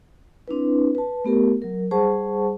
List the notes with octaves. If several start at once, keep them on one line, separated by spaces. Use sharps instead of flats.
C4 D4 E4 B4
B4 A5
A3 B3 G4 A#4
F#3 A#4
G3 G#4 C5 F#5 A5 C#6